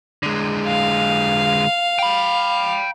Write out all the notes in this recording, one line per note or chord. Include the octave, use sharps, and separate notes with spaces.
D3 G#3
F5
G5 B5